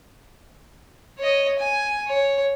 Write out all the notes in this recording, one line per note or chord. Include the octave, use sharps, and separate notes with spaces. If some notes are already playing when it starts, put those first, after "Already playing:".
C#5 D#5
G#5
C#5